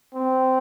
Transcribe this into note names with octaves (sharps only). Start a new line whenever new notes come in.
C4